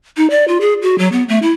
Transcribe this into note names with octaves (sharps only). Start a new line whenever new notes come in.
D#4
D5
F4
G#4
F#4
F#3
B3
A3
E4